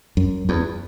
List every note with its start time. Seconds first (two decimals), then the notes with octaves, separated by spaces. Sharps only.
0.17 F#2
0.49 E2